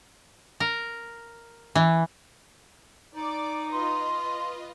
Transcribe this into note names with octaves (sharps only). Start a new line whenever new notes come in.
A#4
E3
D#4 D5 D6
F4 B4 D#5 C6